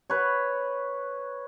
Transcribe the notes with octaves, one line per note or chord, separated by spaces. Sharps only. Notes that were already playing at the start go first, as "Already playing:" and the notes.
B4 C#5